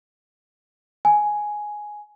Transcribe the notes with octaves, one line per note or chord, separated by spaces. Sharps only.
G#5